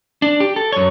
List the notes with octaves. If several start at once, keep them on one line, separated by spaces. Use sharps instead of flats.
D4
G4
A4
F#2 C#5